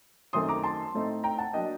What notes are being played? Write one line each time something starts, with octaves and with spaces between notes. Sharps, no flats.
F#2 D#3 A3 C4 C6 D#6
A#5 D6
A5 C6
A2 A3 C4 D#4
G5 A#5
F#5 A5
F#3 A#3 D4 D#5 G5